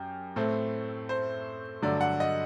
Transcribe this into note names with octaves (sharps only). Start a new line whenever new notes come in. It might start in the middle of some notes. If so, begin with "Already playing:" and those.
Already playing: F#2 G4
A2 A3 C4
C5
G2 D3 F#3 A3 D5
F#5
D#5